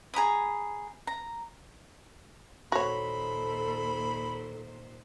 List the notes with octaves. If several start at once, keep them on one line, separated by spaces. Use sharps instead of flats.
G#4 A#5 B5 D#6
A#5
D#2 A#2 F#4 A4 C5 C#5 B5